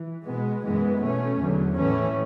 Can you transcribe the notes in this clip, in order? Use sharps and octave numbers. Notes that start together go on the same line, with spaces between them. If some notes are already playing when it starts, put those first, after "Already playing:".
Already playing: E3
B2 G#3 B3
F#2 E3 G#3 B3
B2 A3 C#4
E2 D3 F#3
A2 E3 A3 C#4